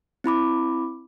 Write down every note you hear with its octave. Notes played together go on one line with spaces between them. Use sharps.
C4 E4 B5 D6